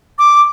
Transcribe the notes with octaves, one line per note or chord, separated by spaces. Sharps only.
D6